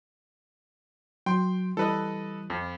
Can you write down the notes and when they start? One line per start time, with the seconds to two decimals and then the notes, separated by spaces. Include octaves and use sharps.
1.26 F#3 G5 C6
1.77 E3 G3 A4 B4 D#5
2.50 F2